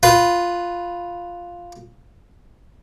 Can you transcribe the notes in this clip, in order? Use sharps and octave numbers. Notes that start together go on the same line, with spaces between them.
F4 B4